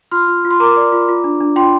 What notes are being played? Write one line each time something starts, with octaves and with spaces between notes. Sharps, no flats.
F4 C6 F6
F4
F4
C6
A#4 A#5 D6
D5
F4
F4
D4
D4
F4 G5 C6